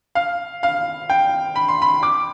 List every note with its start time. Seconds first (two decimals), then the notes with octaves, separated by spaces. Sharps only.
0.15 F5
0.63 F5
1.10 G5
1.56 B5
1.68 C6
1.82 B5
2.03 D6